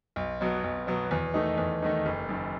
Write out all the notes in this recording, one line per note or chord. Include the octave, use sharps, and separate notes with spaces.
B1
B2 F#3 B3
B1
B2 F#3 B3
E2
D#3 A3 D#4
E2
D#3 A3 D#4
F#1
F#2 D#3